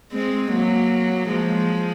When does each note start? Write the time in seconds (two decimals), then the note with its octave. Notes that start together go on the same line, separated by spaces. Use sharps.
0.13 G#3 C4
0.52 F#3 A#3
1.29 F3 G#3